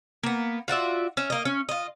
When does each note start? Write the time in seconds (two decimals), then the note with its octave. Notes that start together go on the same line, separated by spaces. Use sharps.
0.23 A#3 B3
0.68 F4 F#4 D5 E5
1.17 C#4 E5
1.30 A#3 D#5
1.45 C#4
1.69 F4 D#5